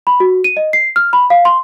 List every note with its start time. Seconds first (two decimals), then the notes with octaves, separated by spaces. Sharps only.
0.07 B5
0.20 F#4
0.44 D#7
0.57 D#5
0.73 C7
0.96 F6
1.13 B5
1.30 F5
1.45 C6